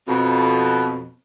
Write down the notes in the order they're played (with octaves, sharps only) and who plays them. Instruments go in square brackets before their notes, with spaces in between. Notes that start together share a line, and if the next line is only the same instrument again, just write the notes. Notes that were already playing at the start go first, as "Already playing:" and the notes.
[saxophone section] F2 B2